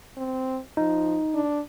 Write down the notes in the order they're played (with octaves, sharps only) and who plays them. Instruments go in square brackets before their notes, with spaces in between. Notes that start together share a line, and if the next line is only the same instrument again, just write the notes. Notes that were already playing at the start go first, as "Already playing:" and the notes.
[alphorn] C4
[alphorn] F3 [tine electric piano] D#4
[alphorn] D4